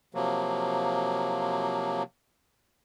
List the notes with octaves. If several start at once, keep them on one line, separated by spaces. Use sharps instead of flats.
C3 F3 F#3 A#3